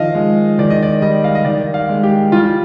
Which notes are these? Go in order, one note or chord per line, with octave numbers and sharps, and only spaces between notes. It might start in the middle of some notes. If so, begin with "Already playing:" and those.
Already playing: D#3 F3 D#5 F5
G#3
D#3 D5
D#5
D5
G3 D#5
F5
D#5
D#3 D5
F5
G#3
G4
G3 F4